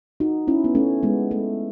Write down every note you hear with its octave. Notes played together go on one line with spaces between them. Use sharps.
D#4 F#4
C#4 E4
B3
A3 C#4
G#3 B3
A3